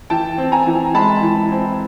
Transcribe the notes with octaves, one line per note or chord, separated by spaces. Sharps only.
E3 G5 A5
C4
G#5 A#5
E3
G#3 A5 B5
E3
C4